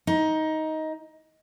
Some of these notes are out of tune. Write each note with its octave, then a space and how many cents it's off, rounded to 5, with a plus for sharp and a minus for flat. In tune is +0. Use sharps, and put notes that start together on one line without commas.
D#4 +15